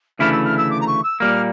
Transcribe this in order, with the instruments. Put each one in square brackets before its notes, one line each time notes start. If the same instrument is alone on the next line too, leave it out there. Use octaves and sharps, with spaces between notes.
[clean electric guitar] D2 C#3 E3 A3 E4 [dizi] F6
[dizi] E6
F6
E6
D6
A#5
C#6
E6
[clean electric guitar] A#2 G3 A#3 [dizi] F6